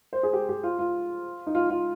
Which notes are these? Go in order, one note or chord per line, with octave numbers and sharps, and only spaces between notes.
C5
G#4
G4
G4
F4
F4
D#4
F4
F4